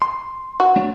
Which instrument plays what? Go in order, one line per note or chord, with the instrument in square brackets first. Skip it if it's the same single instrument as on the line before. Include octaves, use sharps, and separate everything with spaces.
[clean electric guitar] C6
[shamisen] F#4
[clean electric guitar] A3 D4 C#5